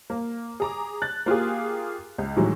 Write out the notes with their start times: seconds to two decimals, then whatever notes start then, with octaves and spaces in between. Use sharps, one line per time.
0.10 A#3
0.60 G#4 A#5 D6
1.02 F#6 A6
1.26 A#3 F4 G4 G#4
2.18 C#2
2.36 A2 D#3 E3 F#3 G#3